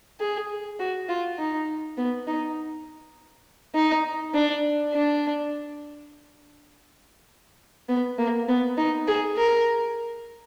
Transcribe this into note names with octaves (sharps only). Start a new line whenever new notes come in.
G#4
F#4
F4
D#4
B3
D#4
D#4
D4
D4
B3
A#3
B3
D#4
G#4
A#4